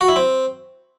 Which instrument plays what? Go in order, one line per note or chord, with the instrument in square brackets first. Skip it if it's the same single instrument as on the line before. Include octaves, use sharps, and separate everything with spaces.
[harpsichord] F#4
E4
C4